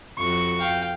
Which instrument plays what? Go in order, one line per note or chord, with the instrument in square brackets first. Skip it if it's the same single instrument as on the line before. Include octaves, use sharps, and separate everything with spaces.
[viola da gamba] F2 F#4 [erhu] C#6
[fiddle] F5 G5